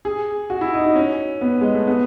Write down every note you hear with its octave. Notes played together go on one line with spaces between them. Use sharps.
G#4
F#4
E4
D#4
D#4
C#4
B3
G#3
A3
B3